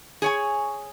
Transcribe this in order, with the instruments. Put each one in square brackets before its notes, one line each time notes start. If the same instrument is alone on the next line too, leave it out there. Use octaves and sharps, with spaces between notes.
[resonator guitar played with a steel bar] G#4 C#5 G#5